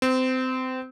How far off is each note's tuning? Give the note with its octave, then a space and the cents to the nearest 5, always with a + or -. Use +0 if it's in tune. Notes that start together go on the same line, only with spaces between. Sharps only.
C4 -25